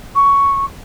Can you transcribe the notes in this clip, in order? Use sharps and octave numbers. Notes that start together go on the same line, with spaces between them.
C#6